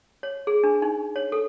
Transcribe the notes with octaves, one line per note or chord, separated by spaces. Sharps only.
C#5
G#4
D4
D#4
C#5
A4